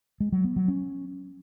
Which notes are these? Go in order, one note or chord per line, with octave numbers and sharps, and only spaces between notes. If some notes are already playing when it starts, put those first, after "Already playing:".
G#3
F#3
B3
F#3
C#4